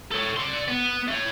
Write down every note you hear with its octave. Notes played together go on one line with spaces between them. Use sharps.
A4 C#5
D5 C6
B3
A3 C#5